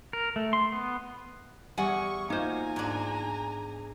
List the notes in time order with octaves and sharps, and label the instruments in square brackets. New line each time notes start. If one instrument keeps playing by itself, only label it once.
[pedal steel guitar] A#4
A3
C6
B3
[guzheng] E2 [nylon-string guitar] G3 [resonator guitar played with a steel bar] F#5 G#5 [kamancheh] C#6
[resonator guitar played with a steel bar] A#3 C5 [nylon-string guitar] D#4 F4 F#4 [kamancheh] G#5 A#5
[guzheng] G#2 D4